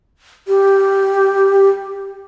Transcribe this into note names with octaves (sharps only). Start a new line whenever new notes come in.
G4